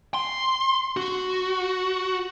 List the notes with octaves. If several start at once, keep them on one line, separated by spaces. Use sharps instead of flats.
C6
F#4